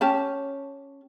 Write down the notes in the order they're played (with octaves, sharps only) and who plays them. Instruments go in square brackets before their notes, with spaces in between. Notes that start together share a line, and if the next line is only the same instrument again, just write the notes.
[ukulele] C#4 G4 A5